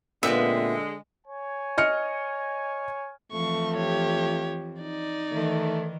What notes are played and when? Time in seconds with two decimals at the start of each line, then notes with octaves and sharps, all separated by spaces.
0.23 A#2 D3 G#3 B3 C4 F4 E5
1.26 C#5 G#5
1.78 D#5 F6 C#7
3.32 F2 E3 F3 A3 C#6
3.77 G4 C#5
4.82 D#4 D5
5.32 D#3 E3 A3